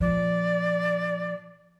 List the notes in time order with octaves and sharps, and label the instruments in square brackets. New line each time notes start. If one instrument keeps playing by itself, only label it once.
[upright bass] A#2 F3 [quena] D5